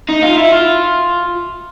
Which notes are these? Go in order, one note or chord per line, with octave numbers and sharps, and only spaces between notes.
D#4
F4
E4
F4